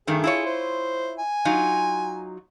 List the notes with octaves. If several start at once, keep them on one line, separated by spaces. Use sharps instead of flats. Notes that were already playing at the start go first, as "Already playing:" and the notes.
G2 D#3 A3 G#4
E4 F4 C#5
C5
G#5
F#3 D#4 F4